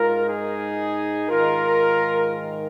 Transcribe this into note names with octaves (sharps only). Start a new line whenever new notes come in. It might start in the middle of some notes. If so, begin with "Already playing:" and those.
Already playing: G#2 G#3 F4 A#4
D#4 G#4
G#2 D#3 G#3 F4 A#4